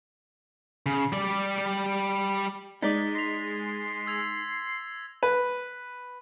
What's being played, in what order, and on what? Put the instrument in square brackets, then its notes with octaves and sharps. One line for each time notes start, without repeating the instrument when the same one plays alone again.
[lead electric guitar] C#3
G3 D5
[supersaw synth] G#3 [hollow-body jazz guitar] D#4 D5 [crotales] A6 B6 G7
[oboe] C6 [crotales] A#6 B6 F7
[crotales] E6 G#6 F7
[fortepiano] B4